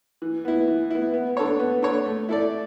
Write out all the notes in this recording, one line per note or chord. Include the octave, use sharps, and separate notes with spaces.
E3
B3 E4
E3
B3 E4
B3
D4 A4 C#5
B3
D4 A4 C#5
A3
E4 A4 D5